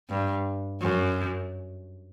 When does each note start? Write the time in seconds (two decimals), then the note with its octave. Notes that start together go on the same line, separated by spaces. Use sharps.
0.09 G2
0.81 F#2